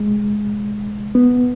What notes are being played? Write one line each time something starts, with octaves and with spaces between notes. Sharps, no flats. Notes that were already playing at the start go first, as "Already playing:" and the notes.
Already playing: G#3
B3